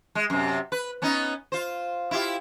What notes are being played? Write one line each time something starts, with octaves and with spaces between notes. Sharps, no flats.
G#3
F#2 C3
B4
B3 C#4 D#4
F4 C5
E4 F4 G4